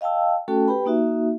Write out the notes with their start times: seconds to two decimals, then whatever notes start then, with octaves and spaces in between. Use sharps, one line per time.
0.01 D#5 F5 G5 A5 E6
0.48 A3 C#4 F#4 A4 G5 A5
0.68 G4 B4 G5 B5
0.86 A#3 D#4 F#4 E5